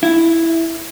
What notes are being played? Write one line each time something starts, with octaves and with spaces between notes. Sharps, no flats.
E4